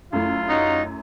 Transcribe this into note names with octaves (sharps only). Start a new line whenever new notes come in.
F#2 A3 E4 F4
F#3 D#4